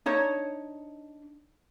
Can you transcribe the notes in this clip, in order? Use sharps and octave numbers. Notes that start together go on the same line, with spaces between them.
D4 D#4 C#5